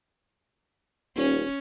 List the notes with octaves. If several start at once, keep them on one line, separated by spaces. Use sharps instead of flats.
D#1 C#4